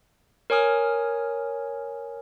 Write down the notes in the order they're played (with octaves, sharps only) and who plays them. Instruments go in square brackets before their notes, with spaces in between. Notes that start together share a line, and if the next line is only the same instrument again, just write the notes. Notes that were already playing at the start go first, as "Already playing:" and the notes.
[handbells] A#4 C#5 G#5 D#6 F6